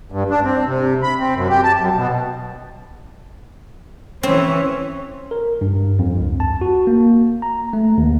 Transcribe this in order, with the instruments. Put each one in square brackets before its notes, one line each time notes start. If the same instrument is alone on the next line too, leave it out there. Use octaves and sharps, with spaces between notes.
[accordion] G2
D4
C4
C3
B5
C4
F#2
G4
A5
F#2
B2
[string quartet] E3 C#4 [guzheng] C4
[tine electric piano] A#4
G2
F2
C#2
A5
F#4
A#3
A#5
A3
D#2